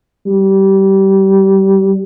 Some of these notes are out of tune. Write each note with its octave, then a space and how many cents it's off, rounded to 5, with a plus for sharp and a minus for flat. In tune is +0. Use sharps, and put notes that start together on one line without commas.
G3 -20